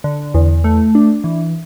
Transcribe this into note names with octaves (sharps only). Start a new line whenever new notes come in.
D3
E2
A3
D4
E3